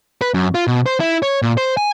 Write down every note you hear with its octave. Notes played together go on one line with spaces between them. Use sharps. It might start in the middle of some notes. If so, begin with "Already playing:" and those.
B4
F#2
F4
B2
C5
E4
C#5
A#2
C5
G#5